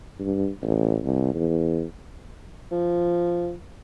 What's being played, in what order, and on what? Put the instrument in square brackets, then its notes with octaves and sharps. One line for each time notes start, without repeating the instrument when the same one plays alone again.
[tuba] G2
A1
C2
E2
[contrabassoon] F3